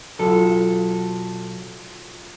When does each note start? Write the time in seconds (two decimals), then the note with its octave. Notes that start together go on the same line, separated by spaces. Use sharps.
0.19 B1 F#3 F4 A4